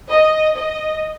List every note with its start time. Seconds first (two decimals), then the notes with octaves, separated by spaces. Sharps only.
0.11 D#5
0.55 D#5